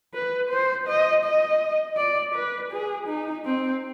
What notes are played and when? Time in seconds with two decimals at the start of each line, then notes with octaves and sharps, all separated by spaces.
0.14 B4
0.50 C5
0.88 D#5
1.25 D#5
1.97 D5
2.35 B4
2.72 G#4
3.08 D#4
3.46 C4